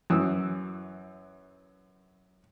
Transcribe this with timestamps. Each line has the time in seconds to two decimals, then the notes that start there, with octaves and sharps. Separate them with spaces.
0.10 F#2 E3 D#6 E6